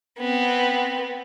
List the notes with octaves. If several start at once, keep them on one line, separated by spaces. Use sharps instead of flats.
B3 C4